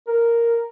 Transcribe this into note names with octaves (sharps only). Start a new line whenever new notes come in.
A#4